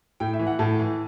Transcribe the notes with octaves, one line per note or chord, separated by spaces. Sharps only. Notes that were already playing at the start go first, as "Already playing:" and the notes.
A2 G5
E5
E3
F#5
A2 A5
E3